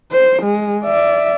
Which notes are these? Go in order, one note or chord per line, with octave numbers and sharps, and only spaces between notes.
C5
G#3
D5 E5